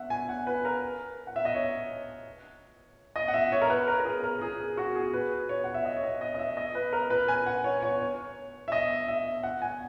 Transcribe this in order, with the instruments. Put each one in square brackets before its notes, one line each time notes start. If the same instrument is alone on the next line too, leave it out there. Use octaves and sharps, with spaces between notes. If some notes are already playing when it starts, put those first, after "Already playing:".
Already playing: [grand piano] E5 F#5
G#5
F#5
B4
A#4
F#5
E5
D#5
C#5
D#5
F#5
E5
C#5
A#4
B4
A#4
A#4
G#4
A#4
G#4
F#4
G#4
B4
C#5
F#5
E5
D#5
C#5
D#5
D#5
D#5
E5
D#5
B4
A#4
B4
G#5
F#5
C#5
C#5
C#5
E5
D#5
E5
F#5
G#5